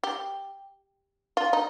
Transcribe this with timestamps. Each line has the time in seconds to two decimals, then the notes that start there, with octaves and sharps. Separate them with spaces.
0.03 G4
1.37 F4
1.53 D#4